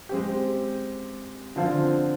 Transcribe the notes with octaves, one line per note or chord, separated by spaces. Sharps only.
G#3 C4 G4
D3 F3 C4 F4